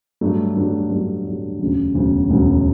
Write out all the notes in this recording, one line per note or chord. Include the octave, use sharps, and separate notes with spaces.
G2 F#3 A3 D4
G2 F#3 A3 D4
G2 F#3 A3 D4
G2 F#3 A3 D4
E1 D2 C#3 F#3
E1 D2 C#3 F#3
E1 D2 C#3 F#3